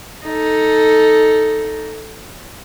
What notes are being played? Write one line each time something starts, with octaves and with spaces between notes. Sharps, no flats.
D#4 A4